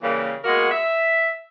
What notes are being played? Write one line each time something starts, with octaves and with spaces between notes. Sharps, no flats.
C#3 E3 G3 A#3
G#3 A#3 B3 F#4 A#4
E5